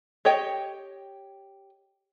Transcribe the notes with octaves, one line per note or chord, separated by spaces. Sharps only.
G4 C#5 D#5 G5